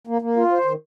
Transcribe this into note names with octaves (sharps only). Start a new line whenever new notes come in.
A#3
A#3
F4
C5
D#3